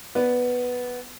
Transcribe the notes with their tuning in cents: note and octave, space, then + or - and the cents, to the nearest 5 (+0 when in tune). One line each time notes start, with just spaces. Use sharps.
B3 +0 B4 +0 D5 +0